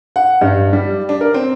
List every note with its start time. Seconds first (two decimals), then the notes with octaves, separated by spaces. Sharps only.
0.16 F#5
0.41 G2
0.73 G3
1.09 D4
1.21 A#4
1.34 C4